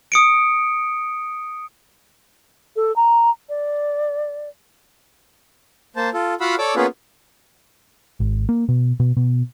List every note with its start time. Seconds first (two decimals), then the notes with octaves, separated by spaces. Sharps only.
0.12 D#6 C#7 D7
2.76 A4
2.96 A#5
3.49 D5
5.96 A#3 C5 A5
6.14 F4 A4
6.41 F4 F#4 F5 F#5 B5 E6
6.58 A4 C#5 D5 D6 E6
6.76 A#3 B3 C#4 F4 G#4 B4
8.20 G#1
8.49 A#3
8.69 B2
9.00 B2
9.17 B2